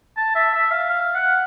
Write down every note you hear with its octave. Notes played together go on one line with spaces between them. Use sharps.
A5
E5
E5
F5
F5
F#5